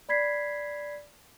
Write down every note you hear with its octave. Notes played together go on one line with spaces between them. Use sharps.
D5 B5 G#6 B6 C7